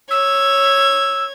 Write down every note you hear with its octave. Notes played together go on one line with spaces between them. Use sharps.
C#5 E6 G#6